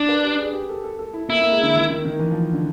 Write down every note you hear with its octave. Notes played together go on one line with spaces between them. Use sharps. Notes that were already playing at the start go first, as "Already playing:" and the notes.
Already playing: D4
B4
G4
G#4
G4
A4
A4
A4
E4
A#3 E4
A#3
G#3
D3
D#3
D#3
D#3
E3
F3
D3